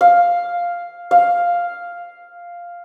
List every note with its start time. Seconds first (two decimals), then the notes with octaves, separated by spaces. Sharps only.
0.01 F5
1.11 F5